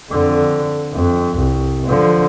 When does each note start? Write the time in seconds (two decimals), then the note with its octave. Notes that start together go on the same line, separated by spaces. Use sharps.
0.11 F2 D3
0.93 F2
1.37 C2
1.87 D3 F3